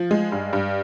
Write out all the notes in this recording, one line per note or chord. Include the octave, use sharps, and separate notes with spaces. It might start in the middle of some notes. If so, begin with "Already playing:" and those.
Already playing: F3
G#3
G2
G2